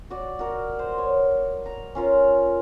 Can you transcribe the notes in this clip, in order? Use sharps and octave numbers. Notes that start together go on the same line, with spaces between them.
F#4 D5
F#4 A#4
C5
C#5
A#5
C#4 F4 A#4